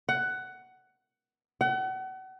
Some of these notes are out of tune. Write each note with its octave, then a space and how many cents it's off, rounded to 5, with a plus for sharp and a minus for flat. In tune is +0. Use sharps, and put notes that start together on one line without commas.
F#5 +15
F#5 +35